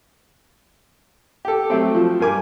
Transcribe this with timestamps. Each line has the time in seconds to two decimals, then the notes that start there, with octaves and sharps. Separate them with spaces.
1.45 G4 A4
1.70 F#3 A3 C4
1.94 F3
2.20 G2 A#4 G#5 D6